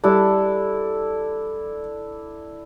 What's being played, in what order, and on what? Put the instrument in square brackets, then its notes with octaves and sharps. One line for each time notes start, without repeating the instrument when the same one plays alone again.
[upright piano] G3 [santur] D4 E4 A4